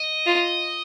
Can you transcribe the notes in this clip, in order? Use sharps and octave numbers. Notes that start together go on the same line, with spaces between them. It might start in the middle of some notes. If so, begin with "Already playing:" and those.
Already playing: D#5
F4